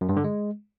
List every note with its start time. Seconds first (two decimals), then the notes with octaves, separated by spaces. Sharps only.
0.01 F#2
0.09 G2
0.17 D3
0.24 G#3